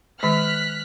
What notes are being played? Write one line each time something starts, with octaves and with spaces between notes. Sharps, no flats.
D#3 G#3 F6 F#6 B6